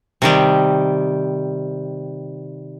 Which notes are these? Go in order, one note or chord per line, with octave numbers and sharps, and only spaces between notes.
C3 D#3 G3